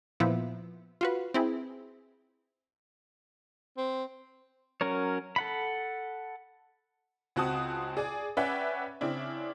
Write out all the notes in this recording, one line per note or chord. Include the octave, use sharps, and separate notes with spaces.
A#2 F3 B3 E4
F4 F#4 B4
C4 E4 G#4
C4
F#3 C#4 A#4 C#5
A4 F#5 B5
C#2 C4 F#4 F#5 A5 D#6
G#4 D5 G#5
C#4 B4 D5 E5 F#5 G5
C#3 C4 D4 E4